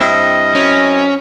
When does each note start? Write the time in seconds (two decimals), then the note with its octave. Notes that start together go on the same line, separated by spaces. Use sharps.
0.01 G2 C4 E4 D#5 E5
0.55 F#2 C#4